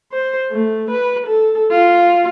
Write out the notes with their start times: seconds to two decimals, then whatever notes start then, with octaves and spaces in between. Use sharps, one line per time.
0.13 C5
0.52 A3
0.91 B4
1.27 A4
1.72 F4